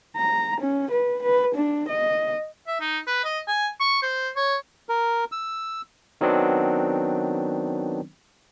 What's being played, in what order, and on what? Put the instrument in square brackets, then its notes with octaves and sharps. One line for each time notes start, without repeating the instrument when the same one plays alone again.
[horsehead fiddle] A#5
C#4
B4
B4
D4
D#5
[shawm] E5
D#4
B4
D#5
G#5
C#6
C5
C#5
[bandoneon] A#4
E6
[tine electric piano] D#3 F#3 B3 C4 D4